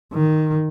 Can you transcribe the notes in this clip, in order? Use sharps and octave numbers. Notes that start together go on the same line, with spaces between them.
D#3